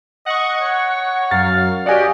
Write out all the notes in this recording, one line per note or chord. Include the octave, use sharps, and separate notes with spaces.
D#5 F#5 C#6
C#5
F#2 F#3 F5 A6
F#4 G4 D5 D#5 F5 G#5